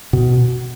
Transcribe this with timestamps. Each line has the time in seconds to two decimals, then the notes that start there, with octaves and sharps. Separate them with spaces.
0.13 B2